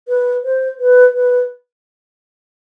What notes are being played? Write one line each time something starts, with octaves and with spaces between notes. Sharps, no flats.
B4
C5
B4
B4